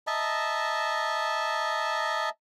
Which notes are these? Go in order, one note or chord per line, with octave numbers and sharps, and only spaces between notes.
D#5 E5 A5 A#5